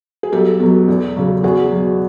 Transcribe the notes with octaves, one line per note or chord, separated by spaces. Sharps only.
G#4
B1 G4 A4
B2 F#3
E2
C#3 F#3
E2 F#4 G#4
B2 F#3